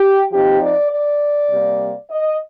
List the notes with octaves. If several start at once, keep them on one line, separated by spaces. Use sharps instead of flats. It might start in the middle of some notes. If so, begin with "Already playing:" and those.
Already playing: G4
F3 C4 D#4 G4
D5
D5
C3 G3 A#3
D#5